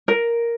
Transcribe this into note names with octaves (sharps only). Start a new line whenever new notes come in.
A#4